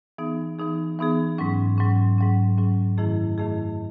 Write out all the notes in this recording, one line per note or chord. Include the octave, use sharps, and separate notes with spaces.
E3 B3 D#4 G#4
E3 B3 D#4 G#4
E3 B3 D#4 G#4
G#2 F#3 C#4
G#2 F#3 C#4
G#2 F#3 C#4
G#2 F#3 C#4
F#2 D#3 A3 E4 G#4
F#2 D#3 A3 E4 G#4